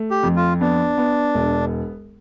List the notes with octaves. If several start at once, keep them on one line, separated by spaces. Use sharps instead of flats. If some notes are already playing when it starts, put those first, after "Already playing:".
Already playing: A3
G4
F2
F4
B3 D4
B3
E1